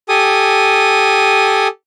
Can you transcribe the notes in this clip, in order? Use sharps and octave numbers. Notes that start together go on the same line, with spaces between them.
G4 A4 G#5 D#6